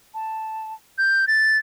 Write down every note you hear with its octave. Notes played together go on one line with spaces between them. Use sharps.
A5
G6
A6